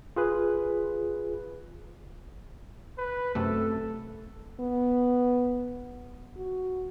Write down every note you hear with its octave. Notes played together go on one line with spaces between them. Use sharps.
F4 G#4 B4
B4
F#2 C3 A3 A4
B3
F#4